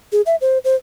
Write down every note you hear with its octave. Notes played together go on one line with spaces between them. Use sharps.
G#4
E5
C5
C5